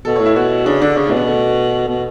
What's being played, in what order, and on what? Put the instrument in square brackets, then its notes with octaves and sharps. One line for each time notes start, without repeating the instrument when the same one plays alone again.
[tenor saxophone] B2 [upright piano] A4
[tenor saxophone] A2 [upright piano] C#5
[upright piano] E4
[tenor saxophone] B2 [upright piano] F#4
[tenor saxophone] C#3 [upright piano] D4
[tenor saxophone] D3 [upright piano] D4
[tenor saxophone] C#3 [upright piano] C#4
[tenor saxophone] A2 [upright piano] D4
[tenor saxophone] B2
[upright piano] B3
A3
[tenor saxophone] B2